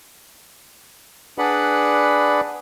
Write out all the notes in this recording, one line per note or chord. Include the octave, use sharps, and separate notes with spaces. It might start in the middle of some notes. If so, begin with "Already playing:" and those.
D4 G#4 B4 D5 F#5 B5